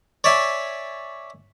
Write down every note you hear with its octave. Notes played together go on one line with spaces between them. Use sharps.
C#5 D5 E5 G#5